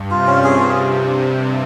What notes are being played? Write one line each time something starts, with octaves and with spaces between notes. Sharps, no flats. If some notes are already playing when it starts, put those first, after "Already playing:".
Already playing: G2
C3 F4
C#4
G#4
F4